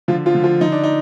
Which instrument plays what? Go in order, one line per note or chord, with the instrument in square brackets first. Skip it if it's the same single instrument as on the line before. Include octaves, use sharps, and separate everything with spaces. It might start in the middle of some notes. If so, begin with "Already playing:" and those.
[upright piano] D3 F3 F4
F3 F4
D3
F3 F4
D3 D#4
D4
D#4